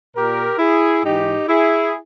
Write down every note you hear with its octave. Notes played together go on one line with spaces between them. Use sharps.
A#2 G4 A#4
E4 G#4
G#2 E3 D#4 G4
E4 G#4